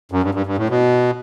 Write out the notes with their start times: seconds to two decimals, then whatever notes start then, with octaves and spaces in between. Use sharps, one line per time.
0.12 F#2
0.23 G2
0.34 G2
0.46 G2
0.57 A2
0.70 B2